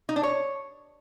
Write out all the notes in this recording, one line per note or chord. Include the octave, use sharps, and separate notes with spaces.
D#4
D4
C#5